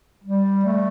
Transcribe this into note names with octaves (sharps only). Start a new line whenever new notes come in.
G3
A3